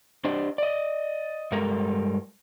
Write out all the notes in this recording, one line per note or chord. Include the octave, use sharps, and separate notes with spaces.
D4 G4 C5 D5 D#5
D5 D#5
G2 G3 G#3 A4 A#4 A#5